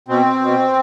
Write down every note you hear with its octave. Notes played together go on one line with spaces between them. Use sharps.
B2 C4
B2